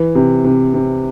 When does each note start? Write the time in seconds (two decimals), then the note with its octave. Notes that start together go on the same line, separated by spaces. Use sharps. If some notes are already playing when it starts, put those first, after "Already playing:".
Already playing: E3
0.15 C3
0.44 C3
0.74 C3